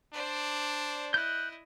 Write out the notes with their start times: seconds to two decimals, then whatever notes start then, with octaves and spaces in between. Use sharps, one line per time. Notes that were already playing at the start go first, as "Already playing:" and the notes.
0.14 D4 C5 D5
1.14 E4 D#5 F#6 G6